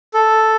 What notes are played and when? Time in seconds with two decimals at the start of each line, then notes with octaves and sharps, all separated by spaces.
0.14 A4